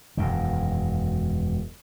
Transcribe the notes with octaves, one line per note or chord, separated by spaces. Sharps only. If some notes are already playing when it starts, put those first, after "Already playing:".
E1 F#2 D#3